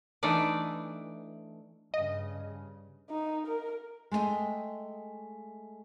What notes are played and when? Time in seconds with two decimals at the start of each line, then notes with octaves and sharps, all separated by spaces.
0.23 E3 A3 D4 D#4 D5
1.94 G2 C#3 D#5
3.10 D#4
3.47 A#4
4.11 G#3 A3 B3 D#5 G5